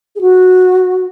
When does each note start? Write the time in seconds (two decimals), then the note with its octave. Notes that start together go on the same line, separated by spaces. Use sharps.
0.16 G#4
0.21 F#4